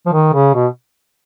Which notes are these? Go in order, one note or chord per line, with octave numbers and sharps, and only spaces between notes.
F3
D#3
C#3
B2